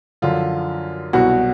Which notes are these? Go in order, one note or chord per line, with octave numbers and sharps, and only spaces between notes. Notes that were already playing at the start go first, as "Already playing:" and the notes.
F#2 D3 F3 F4
C2 B2 F#3 F#4